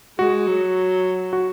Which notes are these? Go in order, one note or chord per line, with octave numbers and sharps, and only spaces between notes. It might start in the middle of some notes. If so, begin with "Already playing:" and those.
G#3 F#4
F#3
F#4